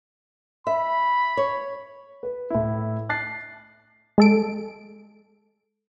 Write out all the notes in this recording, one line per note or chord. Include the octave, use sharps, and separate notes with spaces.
E5 B5
C#5
B4
A2 E4
F#6 A6 C7
G#3 A4 D7